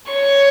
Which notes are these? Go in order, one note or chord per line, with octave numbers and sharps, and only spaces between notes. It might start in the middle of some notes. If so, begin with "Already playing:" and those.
C#5 C#6